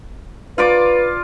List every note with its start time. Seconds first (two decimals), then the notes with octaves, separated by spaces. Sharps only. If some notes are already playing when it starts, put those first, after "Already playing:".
0.58 F4 B4 D5 D6